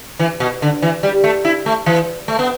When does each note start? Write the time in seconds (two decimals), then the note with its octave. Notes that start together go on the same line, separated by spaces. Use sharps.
0.19 E3
0.40 B2
0.62 D3
0.82 E3
1.03 G3
1.24 A3
1.45 E4
1.66 A3
1.86 E3
2.28 A3
2.39 B3